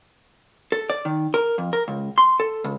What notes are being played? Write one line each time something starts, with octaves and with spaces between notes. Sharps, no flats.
A4
D5
D#3
A#4
F2
A#4
C#2
C6
A4
C#2